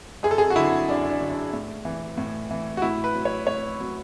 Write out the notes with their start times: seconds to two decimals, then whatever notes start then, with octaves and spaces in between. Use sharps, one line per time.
0.23 F#2 G#4
0.31 A4
0.38 G#4
0.50 F#4
0.56 D3 F#3 E4
0.89 F#2 D4
1.10 D4
1.21 D3 F#3
1.31 D4
1.53 A2
1.85 E3
2.18 A2
2.51 E3
2.77 F#4
2.82 A2 E4
3.04 B4
3.15 F#3
3.25 C#5
3.47 A2 C#5
3.80 F#3